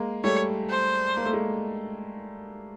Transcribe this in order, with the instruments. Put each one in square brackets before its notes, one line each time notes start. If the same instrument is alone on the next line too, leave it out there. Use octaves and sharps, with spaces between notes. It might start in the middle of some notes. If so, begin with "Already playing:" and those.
Already playing: [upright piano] G#3 A#3
[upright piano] G3 A3 [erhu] C#5
[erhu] C5
[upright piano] A#3
A3
G#3 A#3